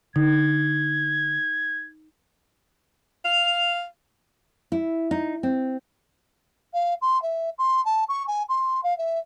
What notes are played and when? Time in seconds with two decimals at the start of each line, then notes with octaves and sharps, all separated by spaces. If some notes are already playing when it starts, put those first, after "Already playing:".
0.16 D3 D#4 G#6
3.25 F5 F7
4.72 E4
5.11 D#4
5.43 C4
6.73 F5
7.01 C6
7.22 E5
7.58 C6
7.85 A5
8.08 C#6
8.27 G#5
8.49 C6
8.83 F5
8.98 E5